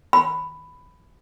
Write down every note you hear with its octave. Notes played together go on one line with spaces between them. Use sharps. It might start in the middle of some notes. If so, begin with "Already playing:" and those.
B5